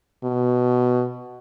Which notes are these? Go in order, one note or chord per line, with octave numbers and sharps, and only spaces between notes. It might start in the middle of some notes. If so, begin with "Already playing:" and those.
B2